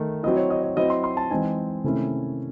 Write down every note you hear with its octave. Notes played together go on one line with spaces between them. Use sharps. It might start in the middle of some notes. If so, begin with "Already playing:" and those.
Already playing: D#3 A3
F#3 C4 E4 D#5
C#5
D#5
C#5
F#3 C4 E4 D#5
C6
C6
A5
E3 G#3 C4 D#4 G#5
C3 D#3 A3 C#4 E4